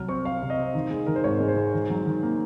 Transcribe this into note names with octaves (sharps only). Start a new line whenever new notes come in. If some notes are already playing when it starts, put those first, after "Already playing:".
Already playing: C2 F#3 F6
C4 C#6
C4 F5
C3
D#5
C4
D#3
G#3
D#3 A#4
C5
G#1 C#5
G#3
C5
G#3
D#3
F#3
D#3
A#3